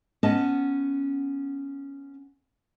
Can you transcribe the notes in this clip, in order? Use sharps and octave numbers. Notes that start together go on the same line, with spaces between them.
B3 C#4 D#5 A5